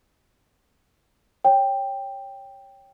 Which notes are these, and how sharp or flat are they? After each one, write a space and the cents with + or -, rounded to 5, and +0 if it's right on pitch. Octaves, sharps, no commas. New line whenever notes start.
C#5 +0 G5 +5